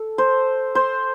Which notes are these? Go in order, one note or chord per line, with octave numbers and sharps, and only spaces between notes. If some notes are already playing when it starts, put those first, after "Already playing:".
Already playing: A4
C5
C5